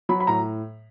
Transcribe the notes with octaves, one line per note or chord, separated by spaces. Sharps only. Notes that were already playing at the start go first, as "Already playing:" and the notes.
F#3 B5
B5
A2 A#5